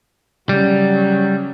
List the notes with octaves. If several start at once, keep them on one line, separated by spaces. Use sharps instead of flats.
C#3 F#3 G3